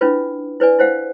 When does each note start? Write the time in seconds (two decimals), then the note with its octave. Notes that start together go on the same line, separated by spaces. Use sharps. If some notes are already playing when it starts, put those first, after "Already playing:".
0.01 C#4 D4 E4 F4 B4
0.60 E4 B4 D5 G#5
0.79 E4 C5 F5 F#5